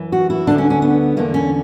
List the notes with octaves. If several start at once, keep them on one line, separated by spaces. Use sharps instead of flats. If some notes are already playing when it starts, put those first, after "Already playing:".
Already playing: F#2 E3
F#4
E4
D2 D3 D4
C#4
C#4
B3
E2 D3 A#3
C#4